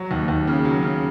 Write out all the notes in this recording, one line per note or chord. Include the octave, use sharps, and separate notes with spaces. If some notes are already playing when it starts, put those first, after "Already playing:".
Already playing: F#3
D#2
D#2
C#3
F#3
C#3